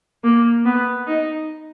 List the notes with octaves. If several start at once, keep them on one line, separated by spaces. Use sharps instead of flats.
A#3
B3
D#4